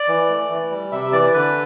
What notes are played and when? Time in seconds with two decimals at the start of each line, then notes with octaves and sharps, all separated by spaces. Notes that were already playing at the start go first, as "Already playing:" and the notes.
Already playing: D5
0.08 E3
0.29 A3
0.50 E3
0.71 G3
0.92 C3 E5
1.12 E3 D5
1.34 D3 B4